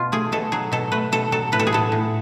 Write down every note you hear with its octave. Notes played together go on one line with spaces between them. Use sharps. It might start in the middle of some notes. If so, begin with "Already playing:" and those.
Already playing: B2 F4
A3 G#4
B2 A4
F#3 G#4
B2 A4
A3 B4
B2 A4
F#3 A4
A2 B4
A4
G#4
B3 A4
A2